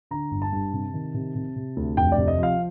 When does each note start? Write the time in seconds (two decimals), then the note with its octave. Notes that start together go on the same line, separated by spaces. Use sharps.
0.11 D3 A#5
0.31 G1
0.42 A5
0.52 G2
0.73 C3
0.94 D#3
1.14 C3
1.35 C3
1.56 C3
1.76 D2
1.97 F1 G5
2.12 D5
2.17 C3
2.28 D#5
2.38 F3
2.43 F5